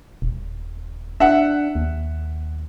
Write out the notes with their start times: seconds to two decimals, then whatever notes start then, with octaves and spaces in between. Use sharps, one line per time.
0.22 D#1
1.20 D4 E5 F#5
1.75 D#2